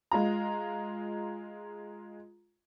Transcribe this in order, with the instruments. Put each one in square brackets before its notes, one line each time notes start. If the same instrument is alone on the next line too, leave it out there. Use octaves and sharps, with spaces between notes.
[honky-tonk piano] G#3 F4 A#5